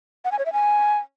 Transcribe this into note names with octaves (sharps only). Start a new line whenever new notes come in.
F#5
G#5
C#5
E5
G#5